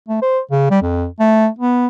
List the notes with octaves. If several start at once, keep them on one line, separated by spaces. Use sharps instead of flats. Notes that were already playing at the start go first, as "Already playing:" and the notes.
A3
C5
C#3
G3
F2
A3
B3